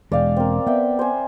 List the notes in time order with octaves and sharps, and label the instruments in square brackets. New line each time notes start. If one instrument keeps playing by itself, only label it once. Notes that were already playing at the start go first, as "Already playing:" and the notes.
[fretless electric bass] E1 G#3 [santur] D5 F5 G5
[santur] C4 A#4
[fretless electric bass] B3 [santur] D5 E5 G5
[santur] C5 G#5